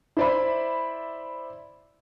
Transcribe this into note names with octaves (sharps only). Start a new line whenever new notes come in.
E4 C5 D5 E5 B5